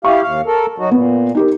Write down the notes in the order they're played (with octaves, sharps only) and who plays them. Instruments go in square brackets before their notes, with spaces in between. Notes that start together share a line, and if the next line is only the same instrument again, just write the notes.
[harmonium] E4 G4 F5 [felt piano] C#6
[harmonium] D#2 F5
A4 A#4
F#3 D#4 F#4
[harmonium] A#2 [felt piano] B3
[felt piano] D#4 G4 A#4